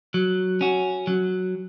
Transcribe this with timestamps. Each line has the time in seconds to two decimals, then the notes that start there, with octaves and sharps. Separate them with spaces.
0.14 F#3
0.61 C#4 F#4
1.07 F#3